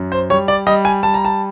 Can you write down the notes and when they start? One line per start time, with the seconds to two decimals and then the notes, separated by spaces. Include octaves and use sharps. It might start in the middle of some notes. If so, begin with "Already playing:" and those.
Already playing: F#2
0.12 C5
0.30 G3 C#5
0.48 D5
0.67 G3 D#5
0.85 G#5
1.03 G3 A5
1.14 A#5
1.25 A5